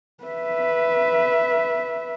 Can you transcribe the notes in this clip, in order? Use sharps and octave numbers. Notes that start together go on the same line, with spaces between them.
B4 E5